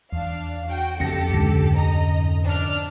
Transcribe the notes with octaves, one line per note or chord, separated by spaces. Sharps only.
E2 D4 F5
F#4 G5
F2 C#3 C#4 G4 A4 A#6 C#7
D2 G#2 D3
D#5 A#5
D4 F6